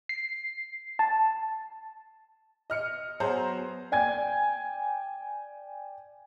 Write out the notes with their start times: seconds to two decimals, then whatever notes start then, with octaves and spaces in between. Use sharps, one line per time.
0.09 C7
0.99 A5
2.70 D#5 F6 C#7
3.20 F#3 B3 G#4 C5 A#5 G6
3.92 D5 G5 G#5 G#6